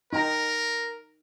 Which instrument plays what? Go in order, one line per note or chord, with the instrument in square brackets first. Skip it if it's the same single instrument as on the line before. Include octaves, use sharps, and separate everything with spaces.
[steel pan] D#4 G5 A#5 [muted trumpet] A#4